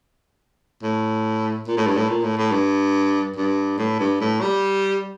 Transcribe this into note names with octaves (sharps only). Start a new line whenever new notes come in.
A2
A#2
A2
G2
A2
A#2
A2
A2
G2
G2
A2
G2
A2
G3